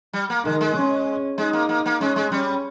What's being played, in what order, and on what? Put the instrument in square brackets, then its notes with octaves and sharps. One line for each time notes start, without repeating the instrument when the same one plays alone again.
[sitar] G3
A#3
[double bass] D#3 [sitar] G#3
[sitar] G#3
[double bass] C#4
[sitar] G#3 [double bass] D#4
[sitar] A#3
A#3
A#3
[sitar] G#3 [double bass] C#4
[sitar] G#3
[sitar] G3 [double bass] C#4